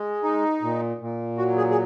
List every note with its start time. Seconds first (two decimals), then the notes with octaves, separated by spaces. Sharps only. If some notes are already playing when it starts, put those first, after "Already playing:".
Already playing: G#3
0.23 D#4
0.62 A#2
1.01 A#2
1.38 F#3 F#4
1.57 G#4
1.70 G#4